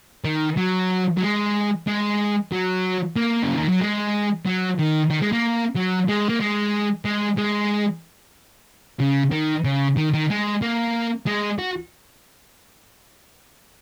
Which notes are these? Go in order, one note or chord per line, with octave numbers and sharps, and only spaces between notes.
D#3
F#3
F#3
G#3
G#3
F#3
A#3
C#3
D#3
F#3
G#3
F#3
D#3
D#3
G#3
A#3
F#3
G#3
A#3
G#3
G#3
G#3
C#3
D#3
C#3
D#3
D#3
G#3
A#3
G#3
F#4